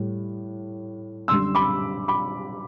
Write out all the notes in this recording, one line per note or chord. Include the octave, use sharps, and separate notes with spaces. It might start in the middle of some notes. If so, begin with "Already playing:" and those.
Already playing: A2 G3
F#2 D3 G3 C6 E6
B5 D6
B5 D6